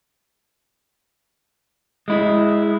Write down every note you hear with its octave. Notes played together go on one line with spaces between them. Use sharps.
G#3 E4